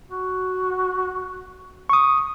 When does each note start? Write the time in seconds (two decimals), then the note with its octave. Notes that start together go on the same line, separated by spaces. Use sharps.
0.10 F#4
1.89 C#6 D#6